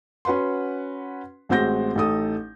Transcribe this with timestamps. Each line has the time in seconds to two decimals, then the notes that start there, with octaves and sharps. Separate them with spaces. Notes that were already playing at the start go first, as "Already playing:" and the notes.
0.25 C#4 F#4 B4 F#5 C6
1.49 A1 G#3 C4 F#4 G6 A#6
1.95 A1 D#4 A4 D#6